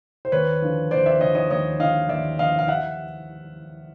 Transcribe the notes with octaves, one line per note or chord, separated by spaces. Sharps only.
C5
D#2 B4 C#5
D3 F3
D#2 C5 D5
D5 E5
D3 F3 C#5 D#5
C#5 D#5
D#2 C#5 D#5
D3 F3 D#5 F5
D#2 D5 E5
D3 F3 D#5 F5
F5
E5 F#5